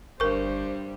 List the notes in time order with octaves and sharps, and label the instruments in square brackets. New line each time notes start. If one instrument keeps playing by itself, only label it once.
[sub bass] G1 [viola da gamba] G2 G3 [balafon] A#4 C#6 [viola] C5